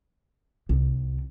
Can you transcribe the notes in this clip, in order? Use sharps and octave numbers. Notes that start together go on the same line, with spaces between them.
C2